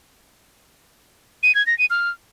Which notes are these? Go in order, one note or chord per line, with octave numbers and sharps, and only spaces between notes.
D#7
G#6
A#6
D#7
F6